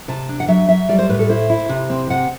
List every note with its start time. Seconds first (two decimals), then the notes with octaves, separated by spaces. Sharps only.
0.08 C3 A5
0.29 D4
0.40 F#5
0.48 F#3 E5
0.69 F#3 E5
0.89 G3 D5
0.98 C5
1.09 A2 B4
1.19 A4
1.29 E4 C5
1.50 E4
1.69 C3
1.90 C4
2.10 C3 F#5